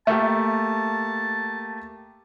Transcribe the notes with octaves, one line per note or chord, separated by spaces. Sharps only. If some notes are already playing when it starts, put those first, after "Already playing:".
A3 A#3 G4 E5 A5